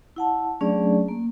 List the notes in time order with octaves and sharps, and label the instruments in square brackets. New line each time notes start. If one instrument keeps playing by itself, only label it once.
[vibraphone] E4 F#5 A5
F#3 A3 C#4 D4 G#4 D5
A#3